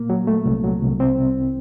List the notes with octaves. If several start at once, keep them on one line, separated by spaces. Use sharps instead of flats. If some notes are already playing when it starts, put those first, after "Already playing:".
Already playing: A#2 A#3
F#3
A3
C2
F#3
C2
C2 C4
C2